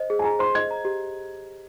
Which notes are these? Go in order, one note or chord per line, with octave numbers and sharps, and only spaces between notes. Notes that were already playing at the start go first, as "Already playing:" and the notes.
Already playing: C5 D#5
G#4
G#5
G#4 A#5
C5 C6
D#5 G#6
A#5
G4